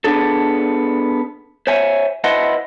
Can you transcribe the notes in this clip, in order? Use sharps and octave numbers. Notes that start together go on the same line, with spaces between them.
B3 D4 G#4 A4
C5 C#5 E5 G#5
E4 B4 C5 D#5 F#5